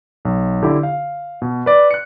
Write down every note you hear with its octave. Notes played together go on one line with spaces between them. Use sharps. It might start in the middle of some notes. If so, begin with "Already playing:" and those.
B1
D3 E4 G4
F5
B2
B4 D5
F#6 C#7